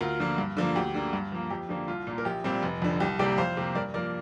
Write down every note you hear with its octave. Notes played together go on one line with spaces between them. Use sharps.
D2 F4 A#4
D3 F3 A#3
G2
D3 F3 A#3
D2 G4
D3 A#3
G2
F3 A#3
F2 G4
D3 F3 A#3
C2 F4
A#2 A#3
A#4
A#1 G4
A#2 G3 C4
F1
F2 D3
C2 G4
C3 G3 A#3 D5 G5
F2 C5 F5
C3 A#3
G2 A#4 D5
F3 A#3 A#4 D5